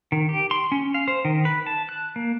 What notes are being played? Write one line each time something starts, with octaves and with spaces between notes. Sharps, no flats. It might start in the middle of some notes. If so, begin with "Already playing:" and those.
D#3
G4
C6
C#4
F5
C5
D#3
B4
A5
F#6
A#3